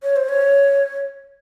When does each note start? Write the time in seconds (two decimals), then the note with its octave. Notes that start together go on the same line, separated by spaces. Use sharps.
0.03 C#5
0.16 C5
0.29 C#5